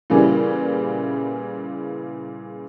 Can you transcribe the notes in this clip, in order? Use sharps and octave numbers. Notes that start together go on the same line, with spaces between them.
A#2 C#3 E3 G3